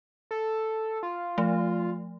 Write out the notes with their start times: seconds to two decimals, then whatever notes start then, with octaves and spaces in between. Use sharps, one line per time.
0.31 A4
1.03 F4
1.38 F3 A3